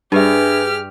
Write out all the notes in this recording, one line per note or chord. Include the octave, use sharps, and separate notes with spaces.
G2 D4 G4 G#4 B4 E5 F6